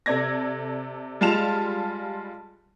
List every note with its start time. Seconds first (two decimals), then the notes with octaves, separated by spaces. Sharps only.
0.06 C3 A4 D5 G#6 A#6
1.21 G3 G#3 F4 A5 E7 F7